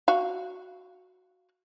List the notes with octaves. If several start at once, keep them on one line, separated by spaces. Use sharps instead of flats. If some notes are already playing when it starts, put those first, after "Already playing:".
F#4 F5